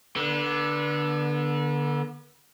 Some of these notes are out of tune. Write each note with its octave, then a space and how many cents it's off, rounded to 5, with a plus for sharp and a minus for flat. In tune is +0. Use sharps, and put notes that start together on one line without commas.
D3 +0 B3 -35